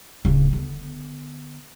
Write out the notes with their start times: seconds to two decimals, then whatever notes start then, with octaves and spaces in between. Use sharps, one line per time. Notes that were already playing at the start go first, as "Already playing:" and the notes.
0.25 D1 C#3
0.53 D3 B3